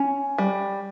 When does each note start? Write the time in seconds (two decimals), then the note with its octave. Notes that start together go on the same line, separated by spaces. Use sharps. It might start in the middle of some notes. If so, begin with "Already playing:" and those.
Already playing: C#4
0.38 G3